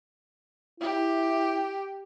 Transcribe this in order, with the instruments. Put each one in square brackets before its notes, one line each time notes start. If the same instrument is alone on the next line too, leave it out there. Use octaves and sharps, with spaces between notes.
[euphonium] E4 [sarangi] G4